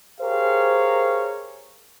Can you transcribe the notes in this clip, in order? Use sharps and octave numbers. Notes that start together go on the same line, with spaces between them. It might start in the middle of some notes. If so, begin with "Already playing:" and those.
G4 G#4 A#4 C5 C#5 F5